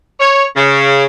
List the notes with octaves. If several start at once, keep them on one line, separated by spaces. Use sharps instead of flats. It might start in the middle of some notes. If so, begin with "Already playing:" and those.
C#5
C#3